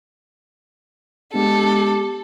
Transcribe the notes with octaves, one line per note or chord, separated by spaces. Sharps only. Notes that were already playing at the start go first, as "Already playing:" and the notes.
G#3 B3 D4 G4 A4